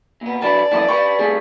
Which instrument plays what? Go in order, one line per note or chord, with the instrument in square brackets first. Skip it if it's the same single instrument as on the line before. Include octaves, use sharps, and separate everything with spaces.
[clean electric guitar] A#2 B3
[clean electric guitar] D3 F#3 B4 [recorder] D5 [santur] A5
[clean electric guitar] F#2 E3 A3 [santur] A5 D6 D#6
[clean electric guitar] G4 B4 G5 [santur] C#6
[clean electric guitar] G3 A3 C4 [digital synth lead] G#4